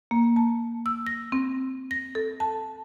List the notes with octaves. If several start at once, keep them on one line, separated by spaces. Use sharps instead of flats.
A#3
A5
E6
A#6
C4
A#6
A4
A5